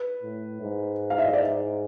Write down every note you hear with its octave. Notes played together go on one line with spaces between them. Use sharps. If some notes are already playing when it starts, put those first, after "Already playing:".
Already playing: B4
A2
G#2
F5
E5
D#5
D5